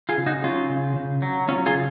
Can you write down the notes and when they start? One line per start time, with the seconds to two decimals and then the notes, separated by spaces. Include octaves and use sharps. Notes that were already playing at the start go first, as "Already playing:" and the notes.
0.09 F4 G#4
0.18 C#3
0.26 D#4 F#4
0.43 F#3 C#4 F4
0.70 C#3
0.96 C#3
1.22 F#3
1.48 F#3 C#4 F4
1.66 F4 G#4
1.74 C#3